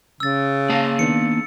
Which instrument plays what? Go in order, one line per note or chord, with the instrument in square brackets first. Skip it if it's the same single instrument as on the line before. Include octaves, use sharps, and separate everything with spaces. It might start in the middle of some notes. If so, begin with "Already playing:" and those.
[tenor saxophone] C#3 [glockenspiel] E6 A6
[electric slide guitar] A#3 G#4 F5 [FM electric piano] A5 A#6
[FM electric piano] D#3 B3 D4 [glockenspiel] C#7